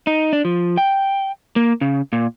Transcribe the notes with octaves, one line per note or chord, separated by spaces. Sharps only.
D#4
D4
F3
G5
A#3
C#3
A#2